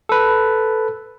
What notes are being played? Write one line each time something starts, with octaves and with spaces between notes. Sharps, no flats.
A4 B4